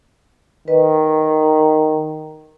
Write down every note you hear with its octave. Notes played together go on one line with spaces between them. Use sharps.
D#3 B4 D#5